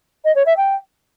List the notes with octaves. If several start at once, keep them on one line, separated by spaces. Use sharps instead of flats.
D#5
C#5
E5
G5